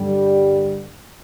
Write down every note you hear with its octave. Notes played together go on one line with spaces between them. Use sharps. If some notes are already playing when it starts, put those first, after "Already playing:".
Already playing: G2 D3 G3